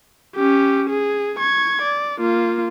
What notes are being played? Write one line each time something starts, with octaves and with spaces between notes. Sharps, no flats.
C#4 G4
G#4
C#6 G#6
D5
A#3 F4